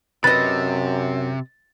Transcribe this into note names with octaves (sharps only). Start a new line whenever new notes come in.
F#2 C3 B4 D#5 A6